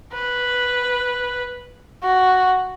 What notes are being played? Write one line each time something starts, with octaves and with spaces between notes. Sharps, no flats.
B4
F#4